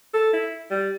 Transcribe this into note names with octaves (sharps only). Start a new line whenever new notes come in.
A4
E4
G3